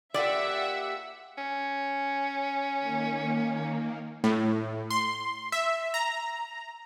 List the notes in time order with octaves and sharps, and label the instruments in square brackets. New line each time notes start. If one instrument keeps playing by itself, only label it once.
[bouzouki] A#3 F4 G4 [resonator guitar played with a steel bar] D5 [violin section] E5 F#5
[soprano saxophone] C#4
[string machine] D#3 A#3
[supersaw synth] A2
C6
E5
A#5